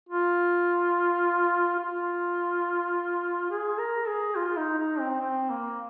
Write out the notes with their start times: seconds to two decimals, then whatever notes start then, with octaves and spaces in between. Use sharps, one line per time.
0.09 F4
1.80 F4
3.50 G#4
3.79 A#4
4.07 G#4
4.36 F4
4.57 D#4
4.78 D#4
5.00 C4
5.21 C4
5.50 A#3